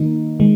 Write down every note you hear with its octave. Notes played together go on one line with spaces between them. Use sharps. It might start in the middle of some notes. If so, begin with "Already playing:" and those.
Already playing: D#3 A#3 D#4
D#3 G#3